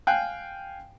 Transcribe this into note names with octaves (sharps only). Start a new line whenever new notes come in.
F5 G5 G#5 F#6